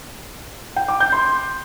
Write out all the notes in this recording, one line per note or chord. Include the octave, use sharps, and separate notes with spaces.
G5
D6
G6
C6